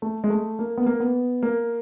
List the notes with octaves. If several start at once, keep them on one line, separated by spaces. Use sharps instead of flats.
A3
G#3
A3
A#3
B3
A#3
B3
A#3